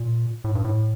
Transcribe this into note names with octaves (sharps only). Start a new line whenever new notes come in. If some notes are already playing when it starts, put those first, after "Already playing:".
Already playing: A#2
A2
G2
A2